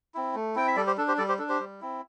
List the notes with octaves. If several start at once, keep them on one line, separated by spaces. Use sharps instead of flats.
C4 E4
A3
C4 E4 G5
E5
G3 A4 D5
G4 C5
D4 A4
G4 C5
G3 A4 D5
G4 C5
D4 A4
G4 C5
G3
C4 E4